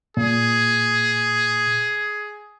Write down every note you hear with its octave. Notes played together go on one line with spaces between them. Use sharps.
A#2 G#4